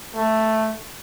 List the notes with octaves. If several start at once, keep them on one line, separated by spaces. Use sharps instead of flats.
A3